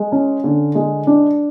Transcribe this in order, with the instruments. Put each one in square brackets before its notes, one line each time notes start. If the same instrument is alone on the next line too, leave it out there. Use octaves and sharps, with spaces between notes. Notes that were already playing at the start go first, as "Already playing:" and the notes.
Already playing: [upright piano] G#3
C#4
D3
G#3
D4